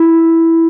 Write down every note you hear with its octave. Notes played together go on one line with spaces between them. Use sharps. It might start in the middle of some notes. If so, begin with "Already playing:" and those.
Already playing: E4